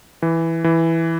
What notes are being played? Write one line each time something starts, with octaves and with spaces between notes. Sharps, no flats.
E3
E3